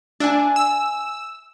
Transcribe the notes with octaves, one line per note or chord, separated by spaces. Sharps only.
D4 E5 G#5
E6